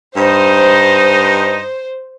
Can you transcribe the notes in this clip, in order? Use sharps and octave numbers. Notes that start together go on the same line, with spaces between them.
G2 D#4 C5